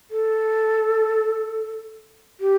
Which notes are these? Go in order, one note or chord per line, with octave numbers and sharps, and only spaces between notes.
A4
G4